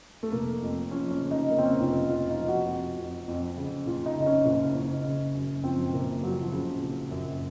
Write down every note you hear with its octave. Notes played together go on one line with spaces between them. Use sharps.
A3
F1 A#3
F2
F3 C#4
C#4
C#3
D#4
C#3 A#3
C4
C#4
D#4
F1 F4
F2 F4
D#4
F3
F#4
F2
F2
F2
C#3
F#1 F4
D#4
C#3 D#4
C#4
F#1
F#1
C#3
F#2
F3 C4
F#1 A#3
F3 F#3
F3
C#3
F#1
F#2